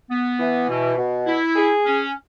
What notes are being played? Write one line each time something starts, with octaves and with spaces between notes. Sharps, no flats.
B3
E3
B2
B2
E4
G#4
C#4